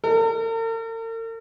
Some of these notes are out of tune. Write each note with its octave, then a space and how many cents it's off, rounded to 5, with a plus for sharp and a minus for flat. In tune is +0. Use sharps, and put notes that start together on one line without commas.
A#4 -45